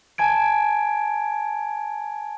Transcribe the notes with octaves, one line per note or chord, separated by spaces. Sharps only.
G#5 A5 G#6 D7